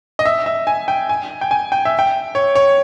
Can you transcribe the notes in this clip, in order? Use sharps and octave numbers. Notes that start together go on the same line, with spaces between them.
D#5
E5
E5
G#5
G5
G#5
G5
G#5
G5
E5
G5
C#5
C#5